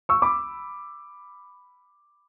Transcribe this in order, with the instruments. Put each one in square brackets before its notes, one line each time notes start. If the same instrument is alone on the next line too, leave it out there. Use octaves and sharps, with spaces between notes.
[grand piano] C#6 E6
B5 D6